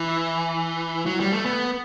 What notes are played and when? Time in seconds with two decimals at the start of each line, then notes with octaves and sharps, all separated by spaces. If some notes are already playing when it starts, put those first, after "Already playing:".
Already playing: E3
1.06 F#3
1.20 G3
1.32 A3
1.46 B3